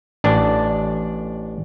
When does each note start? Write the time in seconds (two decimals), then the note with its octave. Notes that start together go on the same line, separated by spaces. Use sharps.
0.24 A1 D4